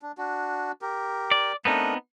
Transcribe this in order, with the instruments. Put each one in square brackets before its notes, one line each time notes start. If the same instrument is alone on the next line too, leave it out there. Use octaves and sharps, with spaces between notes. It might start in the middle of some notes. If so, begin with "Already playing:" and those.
[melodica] D4
D4 F#4
G4 A#4
[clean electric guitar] D5
[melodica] A3 D4 A#4 [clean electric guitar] B3 C4 D#4